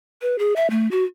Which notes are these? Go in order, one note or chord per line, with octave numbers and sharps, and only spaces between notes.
B4
G#4
E5
A3
F#4